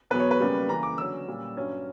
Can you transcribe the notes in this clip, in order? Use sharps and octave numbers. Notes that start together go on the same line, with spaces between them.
E2 B2 F#3 B3 B4
C#5
B4
F#2 C#3 G3 A#3
C#3 E3 A#3 A#5
D6
D3 F#3 C#4 E6
A#2 G3 C#4
G2 F#3 C#4